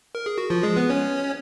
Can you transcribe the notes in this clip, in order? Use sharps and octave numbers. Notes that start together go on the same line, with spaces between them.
A#4
G#4
F#4
F3 F4
G#3 G#4
B3 B4
C#4 C#5